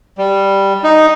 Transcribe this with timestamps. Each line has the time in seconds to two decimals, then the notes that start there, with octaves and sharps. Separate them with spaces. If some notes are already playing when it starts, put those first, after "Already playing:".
0.18 G3
0.84 D#4